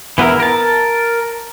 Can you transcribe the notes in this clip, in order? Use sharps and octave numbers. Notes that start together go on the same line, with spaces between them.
E3 B3 E4 A#4
A#4 A5